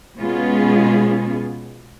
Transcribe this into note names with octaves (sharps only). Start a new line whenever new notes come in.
B2 G#3 B3 C#4 F4 G#4